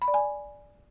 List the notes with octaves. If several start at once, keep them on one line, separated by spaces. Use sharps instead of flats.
B5
D5
G#5